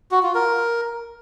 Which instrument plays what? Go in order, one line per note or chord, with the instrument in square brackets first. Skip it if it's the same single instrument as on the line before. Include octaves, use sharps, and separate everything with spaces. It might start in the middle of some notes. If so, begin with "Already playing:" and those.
[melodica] F#4
F4
A#4